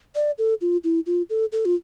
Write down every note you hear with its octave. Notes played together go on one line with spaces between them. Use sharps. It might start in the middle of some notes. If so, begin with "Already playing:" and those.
D5
A4
F4
E4
F4
A4
A4
F4